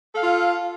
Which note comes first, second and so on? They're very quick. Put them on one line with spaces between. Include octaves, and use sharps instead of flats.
A4 F5 F4